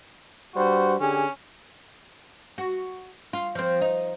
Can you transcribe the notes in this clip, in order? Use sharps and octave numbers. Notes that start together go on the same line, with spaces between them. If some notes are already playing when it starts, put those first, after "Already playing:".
G2 G3 F#4 C5
D3 C#4 G4 G#4
F#4
F4
F3 C4
D#4